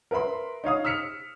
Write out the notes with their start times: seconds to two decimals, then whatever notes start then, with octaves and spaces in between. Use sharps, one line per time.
0.11 A#4 B4 E5 B5 C6
0.64 D#4 C#5 F5 D#6
0.85 E6 F6 B6 C#7 F7